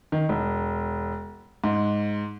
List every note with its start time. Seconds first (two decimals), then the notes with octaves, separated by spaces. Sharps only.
0.12 D#3
0.29 E1
1.64 G#2